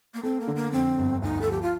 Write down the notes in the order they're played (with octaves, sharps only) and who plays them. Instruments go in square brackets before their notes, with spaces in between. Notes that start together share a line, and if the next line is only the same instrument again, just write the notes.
[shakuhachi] A#3
[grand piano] A3 [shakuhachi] C4
[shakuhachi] A#3
[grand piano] D3
[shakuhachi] A#3
[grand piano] F2 [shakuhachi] C4
[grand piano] G1
[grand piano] D2 [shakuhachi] D#4
[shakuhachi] A4
[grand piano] F3 [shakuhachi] G4
[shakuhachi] F4